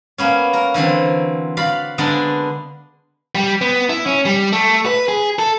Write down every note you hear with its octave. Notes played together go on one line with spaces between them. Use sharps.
A#3 B3 C#4
A#4 A#5
D3 E3 F#3 C4
F#4 D5 F5 B5
D3 G#3 B3 D4 A#4
G3
B3
E4
C#4
G3
A3
B4
G#4
A4